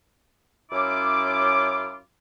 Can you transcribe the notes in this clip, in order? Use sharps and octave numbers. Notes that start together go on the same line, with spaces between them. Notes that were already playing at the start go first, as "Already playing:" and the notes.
F#2 C#4 E4 F4 D6